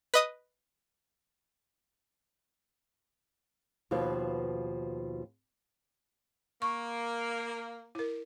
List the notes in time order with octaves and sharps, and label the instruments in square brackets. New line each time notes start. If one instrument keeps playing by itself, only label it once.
[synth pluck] B4 D#5 D#6
[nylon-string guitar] D#2 B2 F3 B4
[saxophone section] A#3 [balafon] C#6
[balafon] E4 A#4